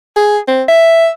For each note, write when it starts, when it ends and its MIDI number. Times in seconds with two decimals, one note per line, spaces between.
0.16 0.38 68
0.48 0.63 60
0.68 1.08 76